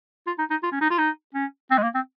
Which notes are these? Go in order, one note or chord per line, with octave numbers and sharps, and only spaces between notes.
F4
D#4
D#4
F4
C#4
D#4
F4
D#4
C#4
C4
G#3
A#3
C4